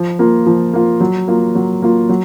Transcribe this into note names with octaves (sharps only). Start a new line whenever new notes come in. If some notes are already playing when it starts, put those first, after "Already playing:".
Already playing: F3
A#3 F4
F3
A#3 F4
F#3
A#3 F4
F#3
A#3 F4
F#3